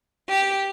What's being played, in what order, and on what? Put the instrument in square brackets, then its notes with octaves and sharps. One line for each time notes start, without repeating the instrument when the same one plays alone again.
[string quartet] G4